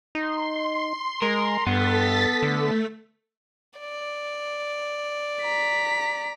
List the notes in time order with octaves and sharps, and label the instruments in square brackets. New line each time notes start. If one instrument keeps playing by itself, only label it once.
[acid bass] D#4 [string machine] C6
[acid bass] G#3 [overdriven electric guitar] A#4
[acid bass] G2 [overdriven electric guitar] B3 [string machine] A4 A6 B6
[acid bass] D3 [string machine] A3
[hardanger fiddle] D5
[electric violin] A#5 B6